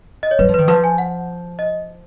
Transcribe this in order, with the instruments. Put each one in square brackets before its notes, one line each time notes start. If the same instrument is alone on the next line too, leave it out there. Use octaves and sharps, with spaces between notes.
[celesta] D#5
C#5
[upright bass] F#3 [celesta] B4
[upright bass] F3
[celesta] B4
[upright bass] D#3
[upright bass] F3 [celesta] B4
[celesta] G#5
F#5
D#5